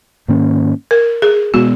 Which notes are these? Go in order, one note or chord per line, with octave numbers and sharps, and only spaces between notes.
G#2 D#3 A#3 C#4
A#4
G#4
B2 G#3 B3 F#4